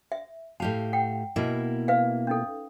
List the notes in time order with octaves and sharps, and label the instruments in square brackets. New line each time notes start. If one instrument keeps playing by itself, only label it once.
[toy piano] E5
[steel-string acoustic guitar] A2 G4 F5 [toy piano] A5
[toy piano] F#5 G5
[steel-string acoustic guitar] B2 A#3 E4
[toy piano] B4 E5 F5
C#4 D#4 A4